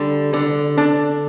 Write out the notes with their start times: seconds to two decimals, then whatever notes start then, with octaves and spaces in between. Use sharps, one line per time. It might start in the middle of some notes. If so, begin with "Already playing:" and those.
Already playing: D3 G3
0.33 D3
0.77 D4